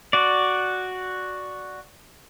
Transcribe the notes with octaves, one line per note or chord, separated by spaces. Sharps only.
F#4 D5